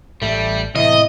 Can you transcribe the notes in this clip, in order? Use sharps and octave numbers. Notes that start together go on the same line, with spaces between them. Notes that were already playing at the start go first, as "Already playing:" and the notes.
A1 A2 G3 A3
E2 A2 C3 E4 D#5